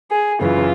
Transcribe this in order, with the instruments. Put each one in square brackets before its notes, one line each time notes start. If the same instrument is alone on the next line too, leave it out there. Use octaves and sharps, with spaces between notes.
[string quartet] G#4
F#2 C#3 E3 F4